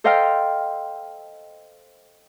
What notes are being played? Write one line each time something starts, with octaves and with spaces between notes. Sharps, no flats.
A4 C5 D#5 F5 G5 F6